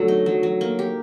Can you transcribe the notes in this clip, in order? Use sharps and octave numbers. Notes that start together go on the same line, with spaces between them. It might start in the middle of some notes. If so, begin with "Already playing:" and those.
Already playing: D3 F#3 A3
D#4
F#3
F#3
A#3
G4